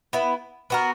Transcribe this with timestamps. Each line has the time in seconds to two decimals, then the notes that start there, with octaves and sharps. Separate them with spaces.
0.13 B3 E4 B4
0.70 B3 F#4 A#4